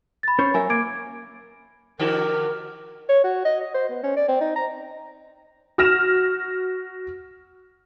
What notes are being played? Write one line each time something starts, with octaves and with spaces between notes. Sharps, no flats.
B5 A6
C#4 C5 C#5
F#3 A#4 E5 G#5
A#3 D6 G#6 D7
D3 F#4 G4 A#4
C#5
F#4
D#5
D#5
C5
B3
C#4
D5
C4
D#4
A#5
F#4 F6 A#6 E7